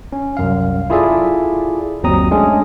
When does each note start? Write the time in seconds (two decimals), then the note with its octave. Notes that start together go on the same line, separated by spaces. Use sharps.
0.12 C#4
0.37 C2 F#2 F5
0.90 E4 F4 G#4 A4 D5 E5
2.03 G1 D#2 F#3 C4 A#5 D#6
2.31 G#3 A3 C#4 D4 G#4